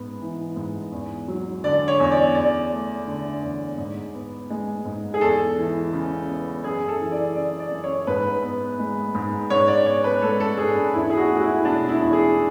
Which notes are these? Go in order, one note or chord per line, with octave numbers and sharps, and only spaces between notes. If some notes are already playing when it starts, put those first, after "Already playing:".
Already playing: G#2 B3
E3
G#2
E2
F#3
D3 D5
C#5
E2
D5
E2 D5
A3
D3
E2
G#2
B3
G#3
G#2
G#4
E2 A4
E3
C#3
B3
F#2 G#4
A4
E3
D5
C#3 D5
D5
F#2
C#5
G#2 B4
B3
G#3
G#2
G#2 C#5
D5
B3 C#5
B4
G#3 A4
A4
G#2 G#4
D4
E2 E4
G#4
F#4
A3
F#4
E4
B2 D4
E4
E2
G#4